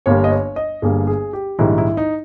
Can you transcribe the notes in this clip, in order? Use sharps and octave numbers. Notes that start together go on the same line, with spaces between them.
G1 G2 G3 A#3 C#5
D#5
C#5
D#5
G1 G2 G3 A#3 G#4
G#4
G4
A#1 G#2 D#3 G3 E4
E4
D#4